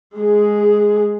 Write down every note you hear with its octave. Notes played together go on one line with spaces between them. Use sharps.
G#3 G#4